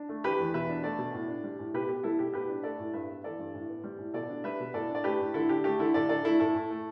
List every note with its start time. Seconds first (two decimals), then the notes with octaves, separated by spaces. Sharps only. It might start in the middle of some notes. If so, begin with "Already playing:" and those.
Already playing: D4
0.09 A3
0.24 E3 G4 B4
0.39 E2
0.54 B2 B4 E5
0.69 D4
0.83 A3 A4 D5
0.98 B2
1.13 A2
1.28 D4
1.44 G3
1.59 A2
1.74 B2 G4 B4
1.88 B3 G4
2.03 G3 E4 A4
2.19 B2 G4
2.34 A2 G4 B4
2.49 D4
2.63 A3 A4 D5
2.79 A2
2.93 G2 B4 E5
3.10 B3
3.24 E3 A4 D5
3.39 G2
3.54 A2
3.69 B3
3.84 G3
3.99 A2
4.14 B2 A4 D5
4.29 D4
4.44 G3 B4 E5
4.60 B2
4.74 A2 A4 D5
4.89 D4
4.95 D5
5.04 A3 G4 B4
5.20 A2
5.34 D3 E4 A4
5.49 D4 G4
5.64 A3 G4
5.79 D3 E4 A4
5.94 A2 A4 D5
6.09 D4 A4 D5
6.24 A3 E4 A4
6.39 A2 E4 A4
6.54 A2
6.70 A3